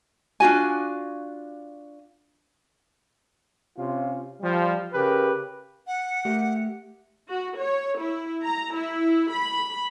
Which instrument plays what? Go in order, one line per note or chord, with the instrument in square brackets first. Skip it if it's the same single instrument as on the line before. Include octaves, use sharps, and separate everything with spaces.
[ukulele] D4 F4 F#4 G#5
[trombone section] C3 C#4 F4
F3 G3
C#3 G4 A#4 B4
[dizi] F#5
[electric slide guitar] A3 G4 A#4
[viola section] F#4
C#5
E4
A#5
E4
B5